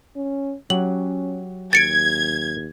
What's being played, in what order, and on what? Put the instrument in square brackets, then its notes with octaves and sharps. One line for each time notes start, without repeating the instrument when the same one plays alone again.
[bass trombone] C#4
[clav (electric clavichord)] F#3 G4 F#5 [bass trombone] C#4 [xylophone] F#7
[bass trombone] D#2 [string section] G#6 [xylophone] A6 C#7 D7